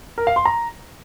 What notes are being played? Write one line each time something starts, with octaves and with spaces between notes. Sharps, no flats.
A#4
F5
C6
A#5